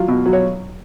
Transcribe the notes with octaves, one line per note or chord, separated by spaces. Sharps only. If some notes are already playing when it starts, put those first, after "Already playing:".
Already playing: F#3 F4 F5
B2
F#3
C#5